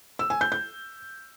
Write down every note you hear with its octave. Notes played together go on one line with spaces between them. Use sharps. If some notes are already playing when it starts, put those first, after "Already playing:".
E6
G#5
G6
G6